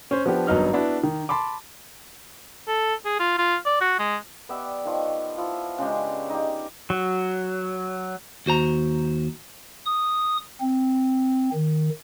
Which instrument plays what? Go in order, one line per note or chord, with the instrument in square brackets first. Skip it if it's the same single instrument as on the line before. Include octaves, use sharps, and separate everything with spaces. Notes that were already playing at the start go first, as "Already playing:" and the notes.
[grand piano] C#4 C5
F3 B3 D4 G4
G#1 G2 F#3 B3 D#4 F6
B3 D4 E4 F#4
D#3
A5 B5 C6 D6
[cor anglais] A4
G#4
F4
F4
D5
F#4
G#3
[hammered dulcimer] B3 G4 D5 E5
D#3 F3 C#6
F3 E4 F4
C#3 G#3 D4 G4
D#4 G4
[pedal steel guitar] F#3
[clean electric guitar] D#2 F#4 C5 A#5
[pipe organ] D#6
C4
D#3